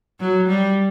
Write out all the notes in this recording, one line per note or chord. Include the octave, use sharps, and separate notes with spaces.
F#3
G3